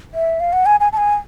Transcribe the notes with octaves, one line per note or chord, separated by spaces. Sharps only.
E5
F5
F#5
G#5
G#5
A5
G#5